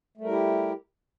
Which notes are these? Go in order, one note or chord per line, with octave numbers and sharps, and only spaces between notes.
G3 A3 E4 G4 A#4